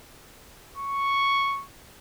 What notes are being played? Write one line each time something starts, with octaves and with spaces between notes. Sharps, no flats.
C#6